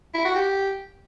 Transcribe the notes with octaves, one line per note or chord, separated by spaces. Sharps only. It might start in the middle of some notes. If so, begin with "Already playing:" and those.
E4
F#4
G4